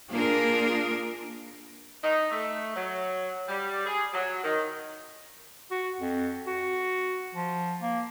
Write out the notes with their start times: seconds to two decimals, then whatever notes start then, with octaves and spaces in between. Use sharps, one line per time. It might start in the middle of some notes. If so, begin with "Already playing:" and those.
0.13 A#3 D4 F4 G#4 A#4
2.04 D#4
2.31 A3
2.76 F#3
3.48 G3
3.86 G#4
4.13 F#3
4.43 D#3
5.71 F#4
6.01 F2
6.47 F#4
7.35 F3
7.82 A#3